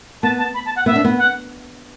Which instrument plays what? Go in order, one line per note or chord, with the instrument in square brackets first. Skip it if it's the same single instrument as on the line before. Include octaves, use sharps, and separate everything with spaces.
[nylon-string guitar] B3 [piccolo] A5
[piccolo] A5
B5
A5
F#5
[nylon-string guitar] B3 [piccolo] E5
[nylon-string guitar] D4
B3
[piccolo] F#5